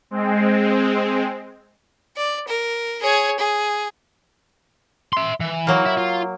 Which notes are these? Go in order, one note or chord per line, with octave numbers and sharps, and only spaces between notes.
G#3 C4
D5
A#4
G#4 C#5
G#4
E5 C6
E3
F#3 A#3
E4 E5
F4